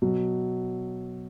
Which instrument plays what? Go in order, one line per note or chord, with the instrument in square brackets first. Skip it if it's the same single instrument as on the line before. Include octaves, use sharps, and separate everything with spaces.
[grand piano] B2 F#3